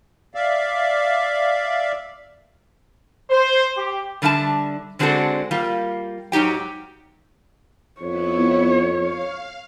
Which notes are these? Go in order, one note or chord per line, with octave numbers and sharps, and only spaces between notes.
D5 E5 F5
C5
G4
D3 G3 D4 E5 A5
D3 G#3 C4 D4 F#4 A4
G3 A#3 F4
G#2 F#3 D#4 G4 G5
F2 B3 E4 C#5
F5